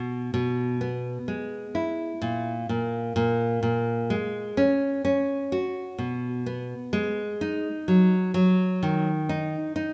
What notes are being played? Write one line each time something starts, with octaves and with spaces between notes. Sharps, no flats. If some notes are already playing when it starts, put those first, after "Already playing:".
Already playing: B2
B2
B3
G#3
E4
A#2
A#2
A#2
A#2
G#3
C#4
C#4
F#4
B2
B3
G#3
D#4
F#3
F#3
D#3
D#4
D#4